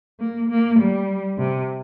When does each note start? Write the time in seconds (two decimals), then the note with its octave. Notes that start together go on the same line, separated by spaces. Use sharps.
0.20 A#3
0.50 A#3
0.80 G3
1.38 C3